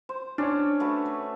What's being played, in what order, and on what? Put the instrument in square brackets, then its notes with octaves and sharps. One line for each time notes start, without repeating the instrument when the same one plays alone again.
[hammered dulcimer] C5
[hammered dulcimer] C#4 [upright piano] D4 C#5
[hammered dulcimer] A3 F#4 B4